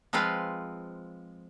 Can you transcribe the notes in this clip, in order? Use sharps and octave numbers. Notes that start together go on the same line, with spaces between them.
F3 G#3 C4 F4 B4 F5